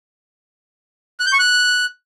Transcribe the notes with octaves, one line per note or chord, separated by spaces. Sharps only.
F#6
G6
C#6
F#6